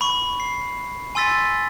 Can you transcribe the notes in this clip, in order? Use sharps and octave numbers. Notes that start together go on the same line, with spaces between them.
B5 C#6
C7
G#5 C6 E6 A6 B6